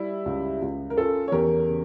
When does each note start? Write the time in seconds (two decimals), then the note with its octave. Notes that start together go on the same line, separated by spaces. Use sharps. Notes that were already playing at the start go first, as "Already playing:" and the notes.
Already playing: G3 E4 G4
0.26 C#2
0.62 C#2
0.90 A#4
0.97 C#4 F4 A4
1.28 C#5
1.32 E2 G4 A#4
1.69 C#3